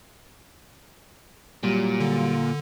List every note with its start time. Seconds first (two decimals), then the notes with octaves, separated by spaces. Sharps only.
1.63 A#2 F#3 G3
2.00 D3